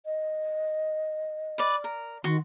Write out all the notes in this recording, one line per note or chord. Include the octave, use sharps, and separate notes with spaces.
D#5
B4 D5
A#4
D#3 F#4 C6